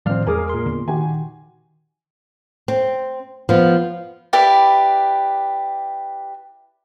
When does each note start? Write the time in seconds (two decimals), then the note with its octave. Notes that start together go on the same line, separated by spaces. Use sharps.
0.06 A2 D#3 F3 C4 D5 F5 F6
0.27 E2 G#3 G#4 A#4 G#5 D6 D#6
0.49 A#2 C6
0.66 D3 B3
0.88 D#3 F#4 G4 G#5
2.68 C4
3.49 F3 B3
4.33 E4 G4 B4 D5